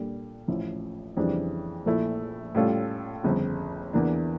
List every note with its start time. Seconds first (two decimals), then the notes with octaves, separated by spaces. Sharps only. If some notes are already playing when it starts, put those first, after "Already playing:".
Already playing: A#2 G3 D4 A4
0.48 A1 A2 F3 C#4 E4
1.17 F2 C#3 E3 G3 D4
1.86 A#1 A#2 A3 E4
2.55 A2 G3 C#4 F4 A4
3.24 G1 F2 C#3
3.93 E2 E3 A#3 D4